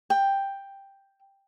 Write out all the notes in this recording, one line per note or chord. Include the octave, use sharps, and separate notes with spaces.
G5